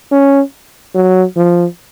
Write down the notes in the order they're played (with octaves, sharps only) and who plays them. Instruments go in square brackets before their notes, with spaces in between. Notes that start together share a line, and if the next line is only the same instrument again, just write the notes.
[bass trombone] C#4
F#3
F3